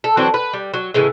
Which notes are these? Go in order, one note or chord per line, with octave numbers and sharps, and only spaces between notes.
A4
E3 F#3 C4 D4
B4
G3
F#3
A2 C#3 E3 G#3